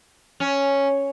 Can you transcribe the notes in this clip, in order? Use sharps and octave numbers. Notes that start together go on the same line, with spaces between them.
C#4